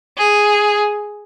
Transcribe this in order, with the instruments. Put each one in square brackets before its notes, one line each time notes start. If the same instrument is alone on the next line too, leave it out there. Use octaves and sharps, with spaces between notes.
[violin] G#4